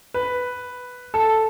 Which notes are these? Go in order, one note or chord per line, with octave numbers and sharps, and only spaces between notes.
B4
A4